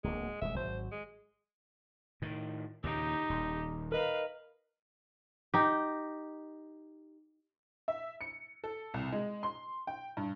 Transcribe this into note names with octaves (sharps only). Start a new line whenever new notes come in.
D1 D2 G#3 A#3
D#1 B2 G#3 E5
G#1 F#3 C5
G#3
A2 D#3
D#2 A#2 C#3 D#4 G4
D#1
A#4 B4 D#5 F5
D#4 G4
E5
C#7
A4
C2
G#3
C6
G5
G2